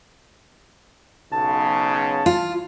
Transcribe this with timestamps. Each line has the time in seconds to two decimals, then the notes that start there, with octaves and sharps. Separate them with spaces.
1.33 B1 C#3 A5
2.26 F4